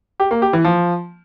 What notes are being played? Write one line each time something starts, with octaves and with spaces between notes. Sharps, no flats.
G4
A#3
G4
E3
F3